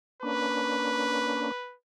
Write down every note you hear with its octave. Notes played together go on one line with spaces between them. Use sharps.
A#3 C#4 D4 B4